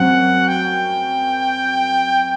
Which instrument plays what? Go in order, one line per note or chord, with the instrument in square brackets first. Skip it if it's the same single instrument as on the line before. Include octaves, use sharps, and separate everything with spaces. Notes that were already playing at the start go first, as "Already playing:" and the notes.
Already playing: [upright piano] F#2 F#3 C4 [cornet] F#5
[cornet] G5